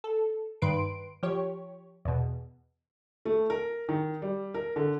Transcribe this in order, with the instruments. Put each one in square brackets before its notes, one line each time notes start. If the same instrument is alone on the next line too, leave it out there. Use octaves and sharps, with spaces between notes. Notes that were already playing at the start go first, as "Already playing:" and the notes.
[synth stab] A4
G2 D#3 B4 C6 D7
F3 G4 C#5
E2 B2
[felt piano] A3
A#4
D#3
G3
A#4
D3